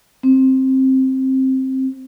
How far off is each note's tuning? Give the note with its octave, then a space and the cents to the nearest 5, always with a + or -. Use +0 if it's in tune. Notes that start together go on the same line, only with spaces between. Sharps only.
C4 +10